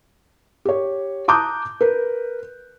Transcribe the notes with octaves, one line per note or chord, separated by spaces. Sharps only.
G4 C#5
A5 A#5 D6 D#6 F#6 G6
A#4 B4